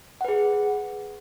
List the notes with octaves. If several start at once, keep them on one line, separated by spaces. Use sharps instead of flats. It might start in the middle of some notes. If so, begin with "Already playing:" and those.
G#4 B4 F#5